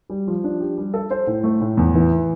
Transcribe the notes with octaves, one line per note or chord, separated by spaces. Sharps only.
G3
F3
D4
G4
G3
A4
C5
A2
A3
A2
E2
E3